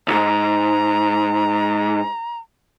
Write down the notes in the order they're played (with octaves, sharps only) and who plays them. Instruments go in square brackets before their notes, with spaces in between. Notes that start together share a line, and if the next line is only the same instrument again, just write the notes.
[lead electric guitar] C2 G#2 [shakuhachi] A#5